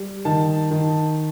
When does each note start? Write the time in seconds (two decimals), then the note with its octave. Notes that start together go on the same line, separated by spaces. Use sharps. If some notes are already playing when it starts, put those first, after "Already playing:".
Already playing: G3
0.25 D#3 A5
0.71 D#3